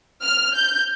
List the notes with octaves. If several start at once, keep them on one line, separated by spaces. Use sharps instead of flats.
F6
G6